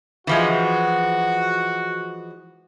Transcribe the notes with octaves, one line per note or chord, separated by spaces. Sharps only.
E3 F3 G#3 F#4